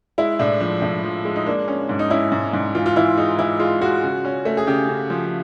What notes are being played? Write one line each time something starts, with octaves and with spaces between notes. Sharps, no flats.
G#3 E4
A2 D4
F3 D4
A2
F3
G#3
D#4
A#3 D4
C#4
G#2
D#4
C#4 E4
G#2
G#2
E3 F4
F4
E3 E4
G#3 D#4
E3 E4
G#3 F4
G#3 F#4
C#3
C#4
A3
G#4
C#3 G4
C#3
F3